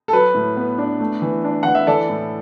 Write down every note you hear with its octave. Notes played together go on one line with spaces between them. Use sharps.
A4
F#3 B4
A2
B3
D4
A3
E3
D4
E3 F#5
E5
E3 A4 D5
A2